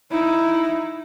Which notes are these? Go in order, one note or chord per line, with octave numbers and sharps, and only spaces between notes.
D#4 E4